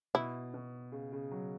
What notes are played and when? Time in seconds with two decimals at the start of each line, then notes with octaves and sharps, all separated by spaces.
0.15 B2 E4
0.54 B2
0.92 C#3
1.12 C#3
1.31 F#3